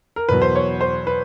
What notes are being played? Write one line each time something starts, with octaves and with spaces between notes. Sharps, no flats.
A#4
E2 B2 F#3 B4
C5
C#5
C5
B4